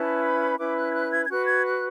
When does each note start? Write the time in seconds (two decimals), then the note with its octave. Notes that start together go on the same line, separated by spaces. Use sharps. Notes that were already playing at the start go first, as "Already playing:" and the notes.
Already playing: C#4 E4 B4 A5
0.23 B5
0.59 C#4 E4 B4 D6
0.77 F#6
0.90 G#6
0.94 F#6
1.12 G#6
1.24 G#6
1.30 F#4 B4 F#6
1.47 G#6
1.65 F#6